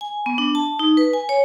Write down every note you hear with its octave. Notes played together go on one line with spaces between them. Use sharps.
G#5
B3
D4
A5
D#4
B4
G#5
C#5